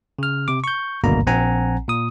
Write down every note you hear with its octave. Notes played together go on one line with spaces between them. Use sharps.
C#3 F6
C3 D6
C#6 G6
G#1 D2 G2 B2 A#3 A#5
A#1 C4 F#5 G#5 A#5
A#2 D#6